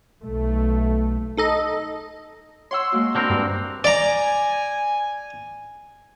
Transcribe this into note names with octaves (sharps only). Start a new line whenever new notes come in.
B1 A3
D#4 A4 D#5
C#5 F#5 C6 E6
G#3 A#3 F#4
D3 C4 D4 A#4 B5
G2
D5 G#5 A#5